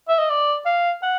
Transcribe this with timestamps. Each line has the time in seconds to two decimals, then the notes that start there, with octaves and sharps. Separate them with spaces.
0.08 E5
0.18 D#5
0.30 D5
0.66 F5
1.03 F#5